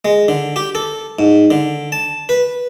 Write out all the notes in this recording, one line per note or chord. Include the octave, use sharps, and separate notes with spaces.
G#3
D3
G4
A4
G#2
D3
A5
B4